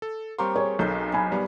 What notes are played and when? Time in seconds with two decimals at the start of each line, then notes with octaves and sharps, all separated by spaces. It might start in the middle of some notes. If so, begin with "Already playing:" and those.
0.02 A4
0.38 G3 A#3 C4 G4 C#5 C6
0.56 G#4 C#5
0.79 B1 A4 G6
1.14 G#5 B5
1.32 G3 B3